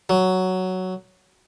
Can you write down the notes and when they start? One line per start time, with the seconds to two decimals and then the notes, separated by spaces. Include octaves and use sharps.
0.10 F#3